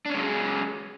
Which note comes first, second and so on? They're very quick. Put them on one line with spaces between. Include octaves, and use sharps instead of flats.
D4 C#4 G#3 F#3 G#4